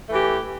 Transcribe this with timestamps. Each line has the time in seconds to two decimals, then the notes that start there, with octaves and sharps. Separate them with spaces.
0.09 A3
0.11 E3
0.14 G4